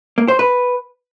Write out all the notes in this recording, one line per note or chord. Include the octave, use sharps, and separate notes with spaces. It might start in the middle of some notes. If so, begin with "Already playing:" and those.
A#3
C5
B4